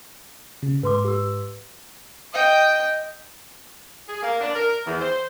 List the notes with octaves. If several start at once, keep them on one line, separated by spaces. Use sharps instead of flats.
C#3
G#2 B4 C6 D6
G4 E6
D#5 G5
G#4
A#3
D4
A#4
E2
C5